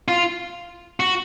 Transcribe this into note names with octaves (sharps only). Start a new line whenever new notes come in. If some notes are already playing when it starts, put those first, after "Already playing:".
F4
F#4